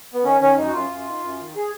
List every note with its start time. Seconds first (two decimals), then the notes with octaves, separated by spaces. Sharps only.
0.14 B3
0.24 D#3 C#4
0.41 D#3 C#4
0.57 F#2 D#4
0.67 F#4
0.73 F#2 F4
0.90 F#2
1.06 D#3
1.23 F#2
1.39 D#3
1.56 G#4